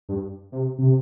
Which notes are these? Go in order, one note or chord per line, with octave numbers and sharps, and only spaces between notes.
G2
C3
C3